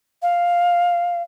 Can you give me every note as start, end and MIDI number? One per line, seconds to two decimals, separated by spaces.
0.22 1.22 77